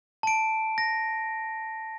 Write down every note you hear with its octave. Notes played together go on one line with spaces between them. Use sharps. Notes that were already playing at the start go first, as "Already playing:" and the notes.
A5 D7
A#6